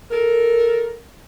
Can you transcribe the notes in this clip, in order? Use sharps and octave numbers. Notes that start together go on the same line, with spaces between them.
A4 A#4